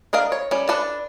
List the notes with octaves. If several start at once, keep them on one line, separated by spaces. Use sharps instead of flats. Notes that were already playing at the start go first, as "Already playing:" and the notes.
D4 A#4 D#5 F5
C#5
G3 C#4
D4 A4 B4 A5